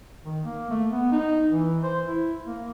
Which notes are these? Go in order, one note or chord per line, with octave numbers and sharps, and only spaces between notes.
D#3
A#3
A3
B3
D#4
E3
C5
E4
A#3